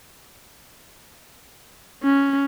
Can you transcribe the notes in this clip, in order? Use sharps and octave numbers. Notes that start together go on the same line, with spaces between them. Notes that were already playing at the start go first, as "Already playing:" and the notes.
C#4